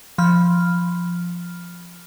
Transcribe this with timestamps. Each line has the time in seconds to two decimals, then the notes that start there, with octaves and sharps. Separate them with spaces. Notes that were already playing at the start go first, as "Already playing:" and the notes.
0.18 F3 B5 F6